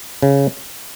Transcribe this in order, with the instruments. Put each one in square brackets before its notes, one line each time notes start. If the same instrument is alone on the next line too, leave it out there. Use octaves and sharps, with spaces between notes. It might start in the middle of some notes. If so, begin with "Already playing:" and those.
[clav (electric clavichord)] C#3